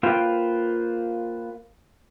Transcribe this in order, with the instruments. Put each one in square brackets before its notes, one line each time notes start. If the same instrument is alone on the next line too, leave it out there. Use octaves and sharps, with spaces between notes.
[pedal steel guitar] A#3 F4 B4 C5 G5